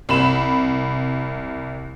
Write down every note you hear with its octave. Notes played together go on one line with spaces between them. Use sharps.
C2 B5 E7